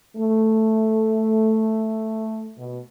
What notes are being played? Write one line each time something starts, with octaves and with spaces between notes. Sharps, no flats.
A3
B2